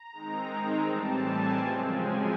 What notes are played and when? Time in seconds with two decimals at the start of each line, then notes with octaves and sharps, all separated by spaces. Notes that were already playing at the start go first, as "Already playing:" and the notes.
Already playing: A#5
0.12 D#3 G#3 C4 D#4
0.84 A2 E3 G3 C4 A5
1.21 G#5
1.57 F#2 C#3 F3 G#3 C4
1.93 G#5